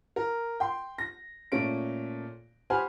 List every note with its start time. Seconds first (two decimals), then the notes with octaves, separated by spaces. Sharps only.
0.16 A#4
0.60 G5 C6
0.98 A#6
1.52 A#2 A3 C#4 D7
2.70 G4 C5 F#5 G#5 B5 F6